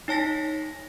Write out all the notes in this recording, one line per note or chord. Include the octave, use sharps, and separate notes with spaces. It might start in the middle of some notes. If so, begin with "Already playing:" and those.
D#4 C#5 A5 A#6 B6